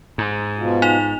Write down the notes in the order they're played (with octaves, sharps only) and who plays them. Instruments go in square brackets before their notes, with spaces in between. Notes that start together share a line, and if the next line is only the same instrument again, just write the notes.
[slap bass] G#2
[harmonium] B2 F3
[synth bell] D#4 F7